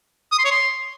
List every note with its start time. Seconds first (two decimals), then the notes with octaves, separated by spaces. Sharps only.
0.32 D#6
0.39 C6
0.45 C#5
0.51 C6